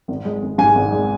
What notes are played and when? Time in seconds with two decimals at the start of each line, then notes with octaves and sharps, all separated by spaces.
0.08 G#1
0.25 G#3
0.42 G#1
0.58 G#2 G#5
0.75 G#1
0.92 G#3